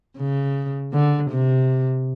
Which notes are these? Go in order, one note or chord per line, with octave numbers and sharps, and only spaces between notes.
C#3
D3
C3